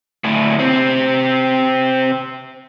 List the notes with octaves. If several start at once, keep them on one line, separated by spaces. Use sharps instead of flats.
D2 A2
C3 C4